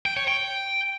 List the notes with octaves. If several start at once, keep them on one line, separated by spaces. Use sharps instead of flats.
G5
C#5
G5